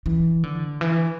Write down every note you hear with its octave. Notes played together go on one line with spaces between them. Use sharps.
E3
D3
E3